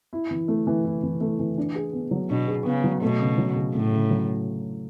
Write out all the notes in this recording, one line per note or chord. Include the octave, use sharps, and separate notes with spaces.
E4
E3
A3
E3
E4
E3
A3
E3
D4
G#4
B3
F#3
B2 D4
G#4
C#3 B3
F#3
B2 A3
C#3
F#3
C#3
A2 A3
C#3
F#3